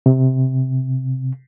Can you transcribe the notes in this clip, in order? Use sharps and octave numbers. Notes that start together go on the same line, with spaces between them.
C3